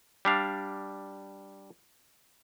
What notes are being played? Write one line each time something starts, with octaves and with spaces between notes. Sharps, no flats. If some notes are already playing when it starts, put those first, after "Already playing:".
G3 D4 F5